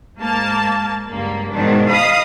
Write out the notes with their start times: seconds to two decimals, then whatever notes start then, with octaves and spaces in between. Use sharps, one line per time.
0.20 G#2 A#3 A5
1.09 C#2 G2 A#3
1.52 G#2 B2 D#3 D4
1.91 D#5 F5 B5 D#6